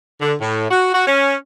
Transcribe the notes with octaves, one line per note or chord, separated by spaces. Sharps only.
D3
A2
F#4
F#4
C#4